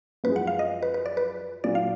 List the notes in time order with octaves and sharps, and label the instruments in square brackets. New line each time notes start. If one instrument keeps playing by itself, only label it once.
[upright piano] F#2 F3 G#3 [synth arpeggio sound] B4
[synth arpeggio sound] F#5
F5
D#5
B4
B4
D5
B4
[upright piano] A#2 F#3 D4 F4 [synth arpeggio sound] D5
[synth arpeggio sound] F5